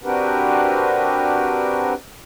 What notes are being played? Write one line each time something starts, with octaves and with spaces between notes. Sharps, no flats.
C4 D4 F#4 G4 A#4 B4